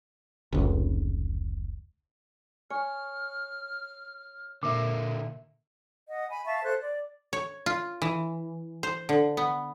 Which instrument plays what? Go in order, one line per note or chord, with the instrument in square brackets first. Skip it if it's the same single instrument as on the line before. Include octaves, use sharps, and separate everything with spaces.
[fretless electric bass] F1 C#2
[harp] C#5 [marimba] G#5 [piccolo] F6
[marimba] A#2 [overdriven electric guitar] D3 A#3 [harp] E5 E6
[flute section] D#5 F#5
G#5 B5
E5 F5 A5 C#6
A4 C5 F#6
D5
[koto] C#5
F4
E3
C5
D3
B3